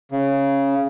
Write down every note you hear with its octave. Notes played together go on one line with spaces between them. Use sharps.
C#3